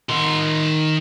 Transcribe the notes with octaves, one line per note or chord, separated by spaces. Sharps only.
D#3 C6